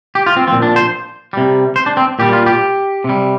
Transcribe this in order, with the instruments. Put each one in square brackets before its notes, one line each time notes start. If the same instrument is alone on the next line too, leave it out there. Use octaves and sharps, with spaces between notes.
[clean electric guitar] G4
F4
C4
A#2 F3 C4
D4
C5
C3 G3
C5
D4
C4
A#2 G3 G4
F4
G4
C3 G3